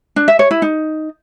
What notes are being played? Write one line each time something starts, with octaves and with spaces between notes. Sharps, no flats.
D4
E5
C#5
E4
D#4